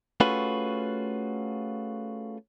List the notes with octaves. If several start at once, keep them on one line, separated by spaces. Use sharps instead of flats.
A3 C#4 F4 F#4 G#4 B4